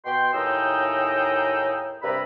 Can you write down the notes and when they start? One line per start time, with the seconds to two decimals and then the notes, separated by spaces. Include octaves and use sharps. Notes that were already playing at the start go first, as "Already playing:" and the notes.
0.05 B2 G5 C6
0.34 D#2 A2 D#4 G#4 G5 E6
2.03 G2 C3 A#4 B4 E5 B5